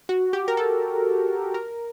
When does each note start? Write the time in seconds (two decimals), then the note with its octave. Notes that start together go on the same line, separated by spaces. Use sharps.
0.09 F#4
0.33 G4
0.48 A#4
0.57 A4
1.54 A#4